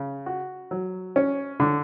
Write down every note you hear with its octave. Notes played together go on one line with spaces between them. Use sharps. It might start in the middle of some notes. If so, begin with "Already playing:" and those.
Already playing: C#3
F#4
F#3
C#4
D3